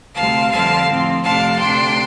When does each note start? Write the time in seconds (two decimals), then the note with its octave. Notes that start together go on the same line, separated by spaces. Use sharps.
0.15 D2 C3 G3 C4 F5 A5
0.51 F2 D3 G3 C4 F5 A5
0.88 A2 F3 C4
1.24 F2 C3 A3 D4 F5 A5
1.60 D2 C3 A3 D4 G5 C6